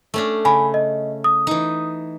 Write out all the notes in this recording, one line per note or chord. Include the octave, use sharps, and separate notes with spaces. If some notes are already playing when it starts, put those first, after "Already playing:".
A3 C#4 D4
C#3 G#5 B5
D#5
D#6
E3 D#4